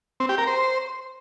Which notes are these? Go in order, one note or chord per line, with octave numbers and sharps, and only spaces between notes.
C4
G4
A#4
C5